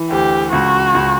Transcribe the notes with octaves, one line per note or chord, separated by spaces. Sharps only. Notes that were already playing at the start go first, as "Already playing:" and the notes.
Already playing: E3
D2 G4
C#2 F#4
C#2